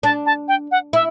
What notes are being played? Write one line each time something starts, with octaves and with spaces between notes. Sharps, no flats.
D4 A5
A5
G5
F#5
E4 E5